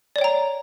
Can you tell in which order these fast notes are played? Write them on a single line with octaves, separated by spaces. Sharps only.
D5 C#5 G5 A#5